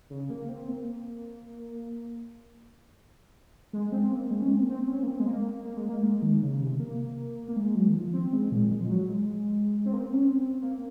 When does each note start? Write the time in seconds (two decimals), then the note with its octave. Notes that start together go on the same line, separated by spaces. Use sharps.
0.10 C#3
0.30 A#3
0.49 C4
0.68 A#3
3.73 G#3
3.92 C4
4.11 A#3
4.31 G#3
4.42 C#4
4.50 C4
4.62 A#3
4.70 C4
4.88 C#4
5.03 A#3
5.08 C4
5.20 G#3
5.27 A#3
5.65 A#3
5.77 G#3
5.89 A#3
6.03 G#3
6.22 D#3
6.42 C#3
6.60 C3
6.80 A#3
7.48 A#3
7.56 G#3
7.75 F#3
7.88 D#3
7.94 F3
8.14 C4
8.33 G#3
8.52 A#2
8.71 G#3
8.81 F3
8.90 F#3
9.09 G#3
9.85 C4
9.93 A#3
10.01 C4
10.13 C#4
10.24 C4
10.62 A#3